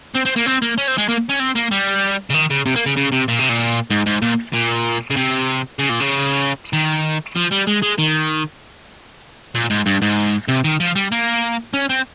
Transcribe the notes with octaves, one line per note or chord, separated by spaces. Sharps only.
C4
C4
A#3
C4
A#3
C#4
C4
G#3
A#3
C#4
C4
A#3
G3
C#3
D#3
C#3
C3
A#3
C#3
C#3
C3
A#2
C3
A#2
G#2
G#2
A#2
A#2
C#3
C3
C#3
A#2
C#3
D#3
F3
G3
G#3
G#3
D#3
A#2
G#2
G2
G#2
C3
D#3
F3
G3
A#3
C#4
C4